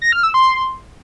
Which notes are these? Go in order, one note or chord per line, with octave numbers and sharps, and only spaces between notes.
A#6
F6
E6
C6